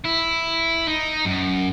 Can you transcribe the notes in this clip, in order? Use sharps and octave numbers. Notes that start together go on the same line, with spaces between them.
E4
D#4
F#2